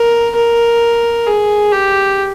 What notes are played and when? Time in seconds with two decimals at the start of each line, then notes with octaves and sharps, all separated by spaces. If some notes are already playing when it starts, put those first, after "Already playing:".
Already playing: A#4
0.36 A#4
1.27 G#4
1.72 G4